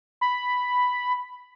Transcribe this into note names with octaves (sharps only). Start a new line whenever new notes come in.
B5